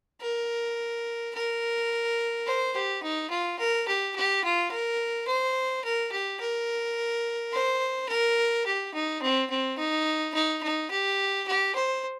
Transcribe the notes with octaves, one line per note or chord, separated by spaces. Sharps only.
A#4
A#4
C5
G4
D#4
F4
A#4
G4
G4
F4
A#4
C5
A#4
G4
A#4
C5
A#4
G4
D#4
C4
C4
D#4
D#4
D#4
G4
G4
C5